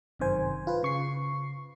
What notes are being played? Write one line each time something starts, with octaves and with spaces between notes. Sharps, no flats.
G1 F#2 C3 D#3 C5 G#5
F4 B4
C#3 C#6 C7